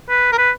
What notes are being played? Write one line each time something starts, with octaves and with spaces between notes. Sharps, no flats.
B4
A#4
B4